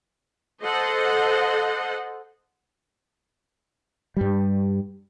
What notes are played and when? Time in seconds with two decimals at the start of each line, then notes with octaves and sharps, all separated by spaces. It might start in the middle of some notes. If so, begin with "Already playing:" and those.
0.62 A4 C5 D#5 F#5
4.17 G2 G3